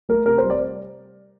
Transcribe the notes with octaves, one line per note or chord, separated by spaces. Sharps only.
A3 A#4
C3 A#4
C5
G3
D5